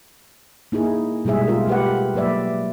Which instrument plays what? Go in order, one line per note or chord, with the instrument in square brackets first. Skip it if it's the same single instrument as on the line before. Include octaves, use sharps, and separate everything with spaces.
[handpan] A#3 D#4 E4 G#4
B2 G3 G#3 G#4 E5
F4 A#4
A3 G4 B4 F#5
F#3 A#3 B4 D5 E5